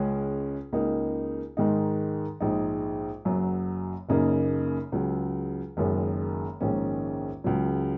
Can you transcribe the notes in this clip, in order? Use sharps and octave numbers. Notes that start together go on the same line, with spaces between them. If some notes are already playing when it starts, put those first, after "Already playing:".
Already playing: C#2 C#3 G#3 C#4
C#2 C#3 A#3 D#4
G#2 D#3 G#3 D#4
A#1 G#2 G#3 D#4
F#1 F#2 F#3
F#1 F#2 C#3 A#3 D#4
C#2 C#3 F#3
F#1 F#2 D#3 G#3
A#1 G#2 D#3 G#3 C#4
C#2 C#3 F#3